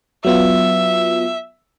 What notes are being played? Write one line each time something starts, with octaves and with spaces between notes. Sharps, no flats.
F#3 B3 F4 E5